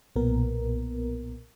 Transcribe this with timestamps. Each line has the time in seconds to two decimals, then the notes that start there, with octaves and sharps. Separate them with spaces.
0.16 B1 A#2 B3 A#4